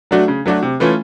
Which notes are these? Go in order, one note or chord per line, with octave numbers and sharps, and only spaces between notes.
F#3 A3 D4 F#4
C#3
F#3 A3 D4 F#4
C3
E3 A3 C#4 F4